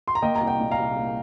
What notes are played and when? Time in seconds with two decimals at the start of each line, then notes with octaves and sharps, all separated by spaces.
0.08 C6
0.15 A#5
0.22 A#3 D#5 G5
0.36 A#5
0.41 C2
0.47 D#5 G5
0.60 A#2
0.71 F5 A#5
0.78 C2
0.96 A#3